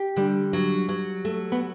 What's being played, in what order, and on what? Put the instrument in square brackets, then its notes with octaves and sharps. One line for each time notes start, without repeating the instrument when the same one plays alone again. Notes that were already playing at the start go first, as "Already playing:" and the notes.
Already playing: [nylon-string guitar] G4
[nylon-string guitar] D3 [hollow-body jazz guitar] G3
[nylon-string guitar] F#3
F#3
A3
[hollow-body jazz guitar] B3